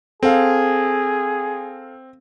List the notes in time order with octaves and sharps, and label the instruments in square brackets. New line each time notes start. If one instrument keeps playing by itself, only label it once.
[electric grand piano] C4 [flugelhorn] G#4 [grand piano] A4 F5